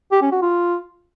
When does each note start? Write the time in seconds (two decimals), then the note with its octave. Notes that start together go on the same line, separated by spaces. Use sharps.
0.12 G4
0.22 C#4
0.32 F#4
0.42 F4